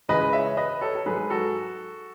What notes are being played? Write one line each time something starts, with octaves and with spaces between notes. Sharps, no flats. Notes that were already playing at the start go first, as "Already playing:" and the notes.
C#2 C#3 E3 G#3 B4 D#5
C#5 E5
B4 D#5
A4 C#5
A4
G#2 F#3 G#4 B4
F#4 A4